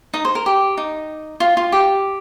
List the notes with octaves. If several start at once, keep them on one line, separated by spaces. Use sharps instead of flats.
D#4 D#5
C5
A#4
G4
D#4
F4
F4
G4